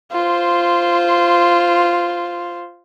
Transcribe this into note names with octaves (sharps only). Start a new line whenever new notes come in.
F4 C5